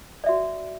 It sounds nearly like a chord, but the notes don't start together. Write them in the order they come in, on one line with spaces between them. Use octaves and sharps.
D5 E5 F#4